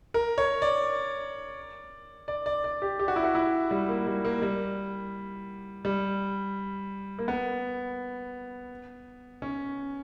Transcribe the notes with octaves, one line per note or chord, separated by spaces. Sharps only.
A#4
C#5
D5
D5
D5
D5
G4
G4
F#4
E4
F#4
E4
G3
A#3
G3
A#3
G3
G3
A#3
B3
C#4